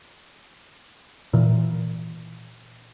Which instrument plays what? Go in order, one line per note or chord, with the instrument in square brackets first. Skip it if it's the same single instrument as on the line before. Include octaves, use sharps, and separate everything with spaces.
[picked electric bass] A#2 E3